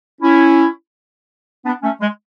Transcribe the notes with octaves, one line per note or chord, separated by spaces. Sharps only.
C#4 E4
B3 D4
A3 C#4
G#3